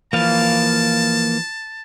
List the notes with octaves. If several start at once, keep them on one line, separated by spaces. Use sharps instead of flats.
E3 F3 A#3 F5 A5